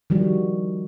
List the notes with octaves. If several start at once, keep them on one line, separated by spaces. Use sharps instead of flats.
D#3 F3 G3 F#4